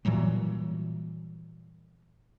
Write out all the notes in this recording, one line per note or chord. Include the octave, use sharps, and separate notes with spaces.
A#2 E3 F#3 G3